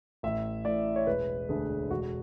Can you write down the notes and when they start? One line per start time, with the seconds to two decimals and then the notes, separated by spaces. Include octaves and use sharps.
0.23 A1 E5
0.65 A2 E3 D5
0.96 C#5
1.07 E1 B4
1.49 D2 D3 A3 G#4
1.90 E1 F#4